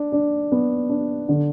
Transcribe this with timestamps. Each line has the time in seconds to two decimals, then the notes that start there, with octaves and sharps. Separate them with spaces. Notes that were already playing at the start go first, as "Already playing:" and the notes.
Already playing: D4
0.12 D4
0.52 B3
0.89 D4
1.29 D3